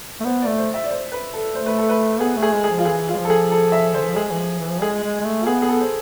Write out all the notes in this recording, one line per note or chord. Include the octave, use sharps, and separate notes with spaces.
A3
B3 C5
A3 D5
C5
E5
D5
C5
B4
A4
A3 C5
B4
A4
B4
B3 G#4
A3
G#4
G#3
G#4
F3
F4
E3 G#4
F4
G#3
F3
A4
G#4
A4
E5
D3 C5
E3
F3
G#3 G#4
E3
F3
E3
F3
G#3 G#4
G#3
G#3
A3
F4
B3 G#4
G#4
A4
C5